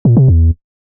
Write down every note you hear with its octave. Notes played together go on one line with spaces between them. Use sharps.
A#2
C3
E2